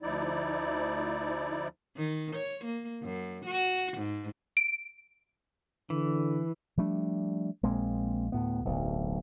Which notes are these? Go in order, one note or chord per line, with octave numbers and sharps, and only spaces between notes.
D2 F3 D#4 E4 D5
D#3
C#5
A#3
F#2
F#4
G#2
D7
D3 E3
F3 G3 A3 D4
A#1 G#3 A#3 C4
D2 A2 B3
D1 B1